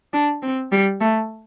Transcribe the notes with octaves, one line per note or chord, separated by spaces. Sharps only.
D4
C4
G3
A3